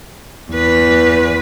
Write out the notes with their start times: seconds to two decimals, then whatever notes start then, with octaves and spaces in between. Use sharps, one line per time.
0.51 E2 B4